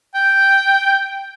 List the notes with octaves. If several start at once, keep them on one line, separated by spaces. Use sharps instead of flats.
G5